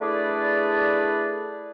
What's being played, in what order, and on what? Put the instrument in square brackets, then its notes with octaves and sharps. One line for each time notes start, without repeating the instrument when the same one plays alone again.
[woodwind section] A3 D4 E4 G#4 B4 D5